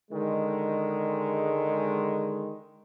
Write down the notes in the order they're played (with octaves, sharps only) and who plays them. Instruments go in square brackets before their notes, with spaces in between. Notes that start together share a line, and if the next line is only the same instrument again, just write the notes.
[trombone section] D3 D#3 G#3